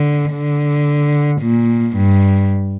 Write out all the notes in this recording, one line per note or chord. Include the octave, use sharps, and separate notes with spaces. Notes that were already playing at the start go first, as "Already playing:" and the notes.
Already playing: D3
D3
A#2
G2